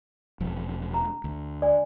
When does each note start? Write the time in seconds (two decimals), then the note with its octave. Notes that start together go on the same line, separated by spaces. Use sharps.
0.40 E1 F3
0.94 A#5
1.24 D2
1.62 D5 G#5